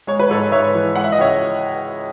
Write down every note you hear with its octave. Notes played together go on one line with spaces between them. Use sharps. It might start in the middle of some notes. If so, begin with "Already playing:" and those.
G#3 C#5
B4
G#2 A4 C#5
G#2 C#5 E5
E3
G#3 F#5
E5
D#5
C#2 C#5 E5